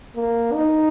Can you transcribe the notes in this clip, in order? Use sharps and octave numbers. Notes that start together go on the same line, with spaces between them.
A#3
D#4